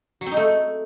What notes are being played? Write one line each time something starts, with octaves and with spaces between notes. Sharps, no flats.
F#3
C4
D#4
A3